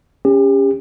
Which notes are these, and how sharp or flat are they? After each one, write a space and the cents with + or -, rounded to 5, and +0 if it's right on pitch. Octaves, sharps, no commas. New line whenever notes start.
C#4 +0 G4 +35